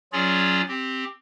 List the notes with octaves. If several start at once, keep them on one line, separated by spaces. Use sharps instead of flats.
F#3 C#4 F4 G#4 C#5 D5
C4 G4